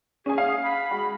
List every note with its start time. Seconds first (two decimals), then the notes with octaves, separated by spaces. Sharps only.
0.26 C#4 G#4 G#5
0.38 F5
0.63 B5
0.91 G#3 F#4